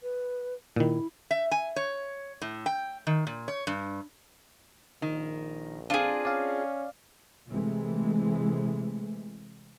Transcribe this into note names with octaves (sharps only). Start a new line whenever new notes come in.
B4
A#2 D#3 E4
E5
G#5
C#5
A2
G5
D#3
A#2
C#5
G2
A#1 D#3
C4 D4 F4 G#4
C#4 D5 F5
C3 E3 G#3 A3